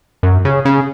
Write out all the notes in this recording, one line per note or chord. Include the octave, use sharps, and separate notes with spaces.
F#2
C#3
C#3